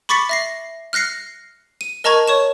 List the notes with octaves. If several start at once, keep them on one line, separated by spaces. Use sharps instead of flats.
B5 C#6 D6 A6 B6 C#7
E5 A#6 C7
F6 F#6 A#6 C7 C#7
D#7
A#4 D#5 A5 A#5 C#6 G#6
C#5 C#6 E7